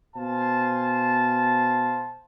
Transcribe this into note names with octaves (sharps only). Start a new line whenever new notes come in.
B2 C5 F5 G#5 A5